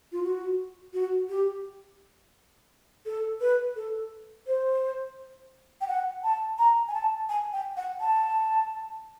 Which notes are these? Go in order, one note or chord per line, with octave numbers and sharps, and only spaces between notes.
F4
F#4
F#4
G4
A4
B4
A4
C5
G5
F#5
A5
A#5
G#5
A5
G#5
G5
F#5
A5